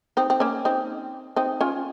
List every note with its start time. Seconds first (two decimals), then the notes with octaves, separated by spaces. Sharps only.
0.17 C4 D#4
0.30 C4
0.40 A#3 C#4
0.65 C4 D#4
1.36 C4 D#4
1.61 C#4 F4